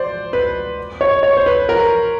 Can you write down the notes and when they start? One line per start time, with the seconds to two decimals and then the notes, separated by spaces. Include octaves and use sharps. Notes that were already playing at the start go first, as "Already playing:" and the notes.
Already playing: C5 D5
0.33 B4
1.01 C#5
1.23 C#5
1.37 C5
1.46 B4
1.69 A#4